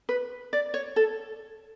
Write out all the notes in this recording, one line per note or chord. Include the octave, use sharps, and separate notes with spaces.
B4
D5
C#5
A4